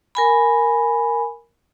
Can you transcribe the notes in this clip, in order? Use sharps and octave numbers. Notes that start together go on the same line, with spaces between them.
A#4 G#5 B5